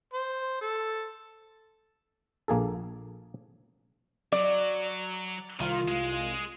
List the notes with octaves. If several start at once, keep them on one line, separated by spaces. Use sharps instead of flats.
C5
A4
A#1 A#3 G#4 A4
F#3 D5
C2 D#3 F4
G#3